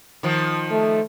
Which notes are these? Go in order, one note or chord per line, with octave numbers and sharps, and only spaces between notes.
D#3 F3
A3